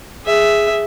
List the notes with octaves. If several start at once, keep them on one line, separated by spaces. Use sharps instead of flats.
G#4 E5